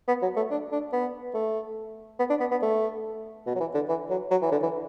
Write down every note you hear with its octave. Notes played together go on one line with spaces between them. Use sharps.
B3
F#3
A3
D4
D4
B3
A3
B3
D4
B3
B3
A3
B2
F#3
E3
D3
E3
F#3
F#3
E3
D3
E3